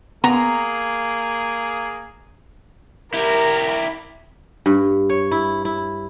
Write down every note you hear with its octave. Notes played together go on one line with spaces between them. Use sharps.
A#3 B3 G#4 A#5
E4 G4 A#4 A#5
G2
C#5
E4
E4